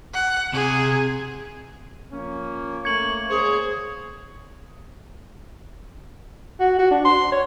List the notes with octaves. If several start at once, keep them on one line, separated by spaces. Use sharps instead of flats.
F#5
C3 G#4
F3 A#3 C#4
A3 A#3 C#4 C#6 G#6 F#7
G#3 A#3 G#4 C5 C#5
F#4
F#4
D4
C6
C#5